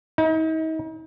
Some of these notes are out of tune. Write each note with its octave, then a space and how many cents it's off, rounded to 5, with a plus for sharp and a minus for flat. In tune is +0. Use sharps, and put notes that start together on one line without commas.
D#4 +40